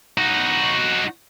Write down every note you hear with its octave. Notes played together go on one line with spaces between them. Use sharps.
D#4 F#4